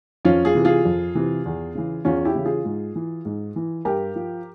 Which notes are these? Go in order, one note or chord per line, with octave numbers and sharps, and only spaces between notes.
F2 C#4 F4
F4 G#4
C3 E3
F4 G#4
F2
C3 E3
E2
C#3 E3
E2 C#4 F4
E4 G4
C#3 E3
F4 G#4
G#2
E3
G#2
E3
G2 G4 A#4
F3